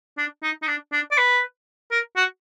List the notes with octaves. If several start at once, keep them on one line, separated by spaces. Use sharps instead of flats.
D4
D#4
D#4
D4
D4
D5
B4
A#4
F#4